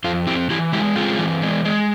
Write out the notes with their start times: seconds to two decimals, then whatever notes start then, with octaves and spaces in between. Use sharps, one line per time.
0.04 F2 F4
0.27 C4 E4 G4
0.50 E3 E4 G4
0.73 G#3 E4 G4
0.96 C4 F4 G#4
1.19 E3
1.42 G#3
1.65 G#3